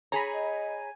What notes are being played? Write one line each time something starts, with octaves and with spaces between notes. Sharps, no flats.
G#4 C#5 G#5 A#5 B5
D#5